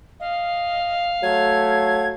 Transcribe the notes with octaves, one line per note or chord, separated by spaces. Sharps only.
D#5 F5
F#3 A3 G#6